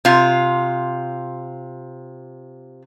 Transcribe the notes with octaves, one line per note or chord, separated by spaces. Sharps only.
C3 F4